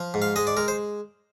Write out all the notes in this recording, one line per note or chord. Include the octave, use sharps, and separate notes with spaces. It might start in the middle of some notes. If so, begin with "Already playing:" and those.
Already playing: F3
G#2
F5
G#3 D#5
D5
G#3 A#4
C5